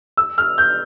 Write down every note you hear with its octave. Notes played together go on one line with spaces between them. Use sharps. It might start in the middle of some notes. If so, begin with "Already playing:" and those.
E6
F6
G6